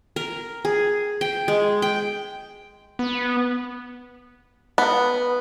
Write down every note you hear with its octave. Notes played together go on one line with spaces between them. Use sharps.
A#4
G#4
G5
G#3
G5
B3
B3